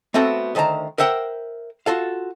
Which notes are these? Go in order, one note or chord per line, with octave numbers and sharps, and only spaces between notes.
A3 B3 C4 F#4 A4
D2 D#3 C5 A5 A#5
A#4 C5 E5 F#5 G5
F4 F#4 A4 F5